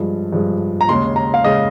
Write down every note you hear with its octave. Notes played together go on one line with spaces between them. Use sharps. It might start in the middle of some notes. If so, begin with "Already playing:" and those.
Already playing: G2 F3 G#3
G2 F3 G#3
A#5
D#2 C#3 G#3 C6
A#5
F5
C#3 G#3 D#5